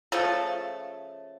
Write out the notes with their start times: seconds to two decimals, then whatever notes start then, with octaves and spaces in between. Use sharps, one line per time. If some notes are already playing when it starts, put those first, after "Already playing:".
0.12 C#3 F3 A3 A4